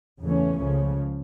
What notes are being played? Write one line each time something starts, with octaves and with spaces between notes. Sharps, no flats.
E2 C#3 E3 A3 C#4
C#2 C#3 F3